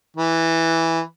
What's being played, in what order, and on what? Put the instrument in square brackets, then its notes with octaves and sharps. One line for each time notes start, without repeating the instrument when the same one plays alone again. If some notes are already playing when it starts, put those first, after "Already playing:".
[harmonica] E3